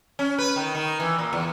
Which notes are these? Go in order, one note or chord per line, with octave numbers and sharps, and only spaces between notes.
C#4
B4
D#3
D#3
E3
A#2
E2